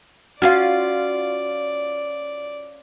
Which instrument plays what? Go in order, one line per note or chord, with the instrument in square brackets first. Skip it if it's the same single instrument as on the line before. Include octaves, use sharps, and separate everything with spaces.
[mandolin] C#4 D4 F4 [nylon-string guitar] F#4 [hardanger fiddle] D5